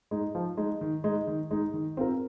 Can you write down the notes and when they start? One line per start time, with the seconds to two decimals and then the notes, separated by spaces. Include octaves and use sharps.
0.11 G#3 D#4
0.35 F3
0.57 G#3 D#4
0.81 D#3
1.04 G#3 D#4
1.27 D#3
1.51 G#3 D#4
1.73 D#3
1.97 C4 F4 A#4